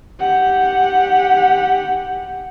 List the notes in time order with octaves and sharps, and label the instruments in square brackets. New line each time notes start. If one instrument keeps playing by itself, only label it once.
[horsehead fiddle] G4 F#5